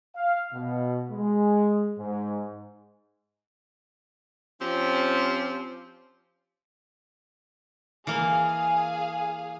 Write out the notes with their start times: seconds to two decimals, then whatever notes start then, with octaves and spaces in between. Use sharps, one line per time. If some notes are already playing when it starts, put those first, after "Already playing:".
0.16 F5
0.53 B2
1.11 G#3
1.98 G#2
4.61 F3 C4 C#4 G4
8.07 E3 A#3 G#4 F5 G#5